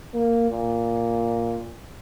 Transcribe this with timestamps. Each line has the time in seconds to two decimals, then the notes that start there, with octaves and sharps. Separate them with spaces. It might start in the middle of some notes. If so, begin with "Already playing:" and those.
0.14 A#3
0.50 A#2